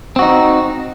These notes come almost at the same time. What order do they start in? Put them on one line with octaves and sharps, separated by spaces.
C4 F#4 D#4